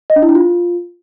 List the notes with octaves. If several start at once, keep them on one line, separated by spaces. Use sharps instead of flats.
D#5
D4
E4
D4
F4